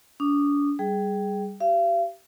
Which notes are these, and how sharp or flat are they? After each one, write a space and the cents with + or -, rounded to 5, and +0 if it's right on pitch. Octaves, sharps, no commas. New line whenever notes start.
D4 -40 D#6 -25
G3 +0 G#4 +5 G5 -5
G4 -25 F5 -40